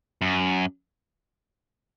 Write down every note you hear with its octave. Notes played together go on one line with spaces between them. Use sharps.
F#2